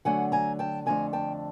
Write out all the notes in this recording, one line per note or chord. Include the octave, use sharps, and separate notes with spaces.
D3 F#3 A3 F#5 G#5
G#5 A#5
G5 A5
F2 D3 F3 A3 G#5 A#5
G5 A5